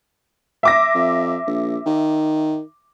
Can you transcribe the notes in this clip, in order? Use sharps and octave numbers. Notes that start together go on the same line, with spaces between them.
E5 D6 A#6
F2
A#1
D#3